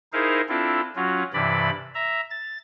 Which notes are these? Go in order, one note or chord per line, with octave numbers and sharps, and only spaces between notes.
D#4 E4 G#4 A#4 C5 F5
C4 D4 E4 F4 A4
F#3 C#4 F4 F#4
G2 C3 E3 D5 B5
E5 A#5
A6